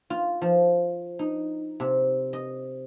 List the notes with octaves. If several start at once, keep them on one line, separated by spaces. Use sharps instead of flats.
F4
F3
D#4
C3
D#5